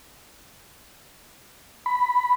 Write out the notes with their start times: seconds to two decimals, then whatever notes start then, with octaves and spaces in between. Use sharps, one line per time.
1.86 B5